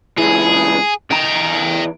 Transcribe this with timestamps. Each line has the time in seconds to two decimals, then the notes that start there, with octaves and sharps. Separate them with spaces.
0.18 C#2 E3 G#4
1.11 E2 D#5 G5 A#5